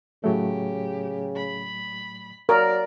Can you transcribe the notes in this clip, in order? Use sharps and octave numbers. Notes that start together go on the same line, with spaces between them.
A2 C#3 F#3 A3 G4
B5
F#3 A#4 D5